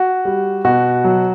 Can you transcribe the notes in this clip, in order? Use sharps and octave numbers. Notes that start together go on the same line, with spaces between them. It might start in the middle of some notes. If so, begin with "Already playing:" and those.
Already playing: F#4
G3
B2 F#4
F#3